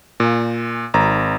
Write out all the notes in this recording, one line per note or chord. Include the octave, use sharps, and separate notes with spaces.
A#2
G#1 A#5